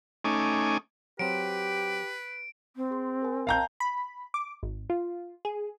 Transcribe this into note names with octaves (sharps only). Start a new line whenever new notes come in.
A3 C#4 D#4 G#5 D6
F#3 C4 G4 B4 D7
C4
G#4 C6
A#4 G#5
D#5 F5 G5 A5 A#5 G6
B5
D6
G#1
F4
G#4